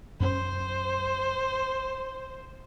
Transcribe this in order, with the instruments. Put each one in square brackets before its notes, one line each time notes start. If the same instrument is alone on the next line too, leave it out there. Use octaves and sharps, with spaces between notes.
[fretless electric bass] F#2 B3 C#4 [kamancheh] C5